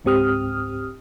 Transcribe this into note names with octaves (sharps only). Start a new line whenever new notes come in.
C#2 G#2 C4 G4 D#6 F6